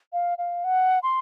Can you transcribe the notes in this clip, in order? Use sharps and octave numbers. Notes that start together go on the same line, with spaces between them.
F5
F5
F#5
C6